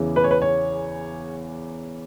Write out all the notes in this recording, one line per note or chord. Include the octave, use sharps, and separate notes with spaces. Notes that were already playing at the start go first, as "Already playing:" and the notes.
Already playing: E2 C#3 E3
B4
C#5
B4
C#5